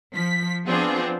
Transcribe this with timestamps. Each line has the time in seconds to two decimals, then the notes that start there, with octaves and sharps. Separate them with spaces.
0.14 F3 B6
0.65 F3 B3 C4 D4 F4 G#4